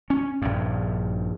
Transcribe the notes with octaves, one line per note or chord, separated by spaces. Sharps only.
C#4
A#1 G2